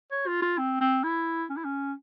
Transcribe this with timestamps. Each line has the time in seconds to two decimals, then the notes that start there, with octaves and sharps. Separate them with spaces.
0.12 C#5
0.27 F4
0.42 F4
0.58 C4
0.81 C4
1.04 E4
1.50 C#4
1.57 E4
1.65 C#4